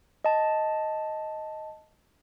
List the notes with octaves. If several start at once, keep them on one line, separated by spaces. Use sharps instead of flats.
D#5 A5